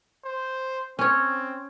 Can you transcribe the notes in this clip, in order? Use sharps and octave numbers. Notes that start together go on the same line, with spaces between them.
C5
C4 C#4 C#5